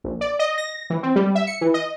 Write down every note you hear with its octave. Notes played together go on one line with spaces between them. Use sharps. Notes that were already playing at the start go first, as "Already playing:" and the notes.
A#1
D5
D#5
A#6
E3
C4
G3
E5
C#7
E3
D#5